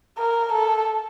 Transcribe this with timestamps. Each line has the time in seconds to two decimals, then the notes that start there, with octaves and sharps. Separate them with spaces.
0.18 A#4
0.52 A4